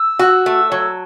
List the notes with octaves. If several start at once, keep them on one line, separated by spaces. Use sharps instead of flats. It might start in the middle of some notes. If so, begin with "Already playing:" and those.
Already playing: E6
F#4
A3
F#3